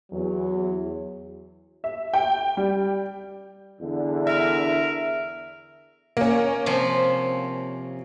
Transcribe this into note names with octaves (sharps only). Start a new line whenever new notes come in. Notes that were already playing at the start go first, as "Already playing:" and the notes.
E2 F#3
E5
G5
G3
E2 D3
A#4 E5
A#3 C#4
C3 F3